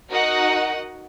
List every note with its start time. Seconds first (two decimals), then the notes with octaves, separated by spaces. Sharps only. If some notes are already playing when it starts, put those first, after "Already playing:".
0.10 D#4 F#4 A#4 D#5 F#5